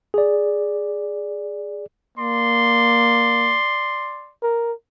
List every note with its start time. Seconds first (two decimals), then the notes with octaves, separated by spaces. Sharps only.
0.14 G#4 D5
2.18 A#3 D5 C6
4.43 A#4